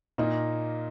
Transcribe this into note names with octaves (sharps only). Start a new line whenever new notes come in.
A#2 A#3 D#4